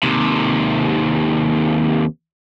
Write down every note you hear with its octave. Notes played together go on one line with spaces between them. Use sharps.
D#2 C3